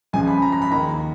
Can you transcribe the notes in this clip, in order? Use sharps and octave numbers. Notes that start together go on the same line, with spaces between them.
C#2 C#3 F3 G#5
B5
A#5
A#5
B5
D#2 D#3 A#5